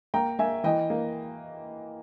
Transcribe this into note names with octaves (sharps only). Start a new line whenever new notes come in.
A#3 G5 A#5
A#3 E5 G#5
E3 D#5 G5
A#3